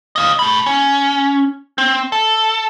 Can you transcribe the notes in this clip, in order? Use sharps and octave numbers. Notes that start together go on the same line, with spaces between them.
D#5 F5
A3 B5
C#4
C4
A4